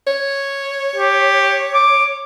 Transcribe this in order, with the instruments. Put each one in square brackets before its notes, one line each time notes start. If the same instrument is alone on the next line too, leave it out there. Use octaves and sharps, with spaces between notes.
[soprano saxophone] C#5
[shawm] G4
D6